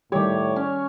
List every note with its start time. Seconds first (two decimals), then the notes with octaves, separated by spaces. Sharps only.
0.12 A2 D#3 G3 G4 C#5 D5
0.56 C#4